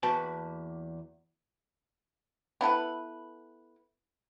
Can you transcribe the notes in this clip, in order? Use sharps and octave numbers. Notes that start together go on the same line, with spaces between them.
E2 A#3 F#4 B4 G5 A5
B3 E4 A4 B4